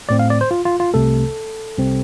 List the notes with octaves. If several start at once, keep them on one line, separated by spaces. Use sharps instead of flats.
A2 A3 C4 D5
F5
D5
C5
F4
F4
F4
C2 C3 A3 A4
C2 C3 G3 C4